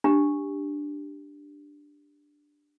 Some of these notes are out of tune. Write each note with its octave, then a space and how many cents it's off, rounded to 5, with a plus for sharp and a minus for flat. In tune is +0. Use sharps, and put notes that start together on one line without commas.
D4 +0 G4 +5